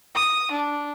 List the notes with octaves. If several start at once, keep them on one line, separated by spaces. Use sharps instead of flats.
D#6
D4